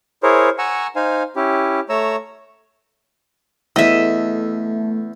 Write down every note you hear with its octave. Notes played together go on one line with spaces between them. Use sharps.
E4 G#4 A#4 C5 C#5
F#5 G#5 A#5 C#6 E6
D#4 C5 F5 G#5
C#4 E4 G4
A3 C#5 A#5 E6
E2 A3 D#5 E5